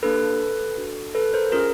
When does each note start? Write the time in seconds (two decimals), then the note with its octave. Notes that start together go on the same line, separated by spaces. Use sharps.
0.03 A#3 D4 G4 A4 B4
0.77 D4 F#4 A4
1.15 A4 B4
1.33 A#4 C5
1.52 C#4 F4 G#4 A#4